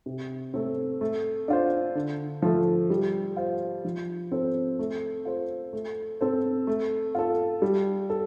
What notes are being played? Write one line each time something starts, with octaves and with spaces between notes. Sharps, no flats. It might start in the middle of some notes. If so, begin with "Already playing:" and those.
C3
A3 C4
A3
D4 F4 C5
D3
F3 A3
G3
F4 C5
F3
C4 A4 C5
A3
F4 A4 C5
A3
C4 A4 C5
A3
F4 A4
G3
A4